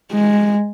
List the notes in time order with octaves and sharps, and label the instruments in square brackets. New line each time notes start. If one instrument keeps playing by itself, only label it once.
[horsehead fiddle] G#3